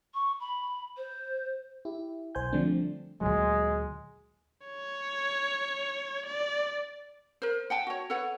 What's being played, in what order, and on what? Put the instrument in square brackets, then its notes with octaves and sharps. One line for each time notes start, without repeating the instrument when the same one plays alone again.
[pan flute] C#6
B5
C5
[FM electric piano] E4 G4
B1 C5 G#5 G6
D3 F3 G3 A3 C4 D4
[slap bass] D2 A#2 F#3 [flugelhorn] G#3
[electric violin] C#5
D5
[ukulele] A#4 C5
F#5 G5 A5
F#4 C#5
A4 B4 C#5 F#5